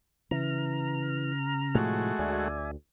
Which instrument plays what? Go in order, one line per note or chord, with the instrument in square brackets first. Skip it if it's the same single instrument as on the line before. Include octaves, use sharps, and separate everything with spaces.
[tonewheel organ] C#3 A#5 F6 [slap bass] E3
[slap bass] A2 C3 F3 [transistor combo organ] G#3 A3 F#4
[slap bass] D2 [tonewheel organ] D5 E5 G#5